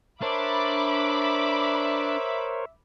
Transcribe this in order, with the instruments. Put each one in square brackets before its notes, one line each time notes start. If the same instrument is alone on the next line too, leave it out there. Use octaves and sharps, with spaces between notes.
[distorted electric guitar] D4 [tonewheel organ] A#4 C5 C#5 [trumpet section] E5 [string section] B5 D6